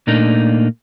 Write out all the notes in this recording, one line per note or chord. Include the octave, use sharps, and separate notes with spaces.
A#2 A3 A#3 D4 D#4